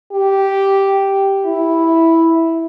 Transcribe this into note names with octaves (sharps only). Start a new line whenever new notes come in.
G4
E4